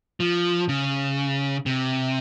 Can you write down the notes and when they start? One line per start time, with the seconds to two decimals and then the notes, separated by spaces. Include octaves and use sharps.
0.20 F3
0.69 C#3
1.66 C3